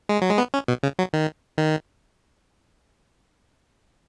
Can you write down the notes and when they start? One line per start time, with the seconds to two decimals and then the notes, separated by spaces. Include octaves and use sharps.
0.09 G#3
0.22 F#3
0.30 G#3
0.38 B3
0.54 C#4
0.68 B2
0.83 C#3
0.99 F#3
1.13 D#3
1.58 D#3